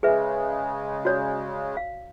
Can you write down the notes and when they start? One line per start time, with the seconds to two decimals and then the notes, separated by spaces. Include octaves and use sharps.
0.03 C#3 G#3 G#4 B4 E5
1.05 F#4 C#5 D5
1.77 F5